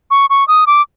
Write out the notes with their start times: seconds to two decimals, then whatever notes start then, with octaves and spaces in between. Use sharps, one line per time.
0.11 C#6
0.30 C#6
0.48 D#6
0.67 D6